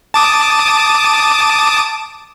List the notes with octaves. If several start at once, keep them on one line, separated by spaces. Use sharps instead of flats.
A5 D6 D#6